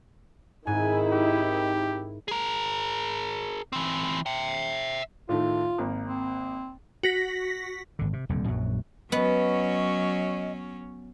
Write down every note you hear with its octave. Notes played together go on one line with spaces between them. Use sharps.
G#2 D#3 C4 D#4 E4 G#5
G4
G#4 A#4
E3 C4
E5 G5
A2 D#3 A3 F4
G#1 A#3
C4
F#4 A#6 B6
G#1 D3
C3
D#1 C2 F2 D3
A#1 F#2 F#3
F#3 B3 C#4 D#5